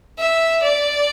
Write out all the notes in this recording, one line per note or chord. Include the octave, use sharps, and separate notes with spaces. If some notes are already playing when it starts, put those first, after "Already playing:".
E5
D5